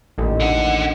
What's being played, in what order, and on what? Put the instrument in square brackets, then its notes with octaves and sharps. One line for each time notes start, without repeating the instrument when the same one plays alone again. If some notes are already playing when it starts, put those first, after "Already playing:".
[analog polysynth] A1 [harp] D#2 A#2
[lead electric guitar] D3 F#5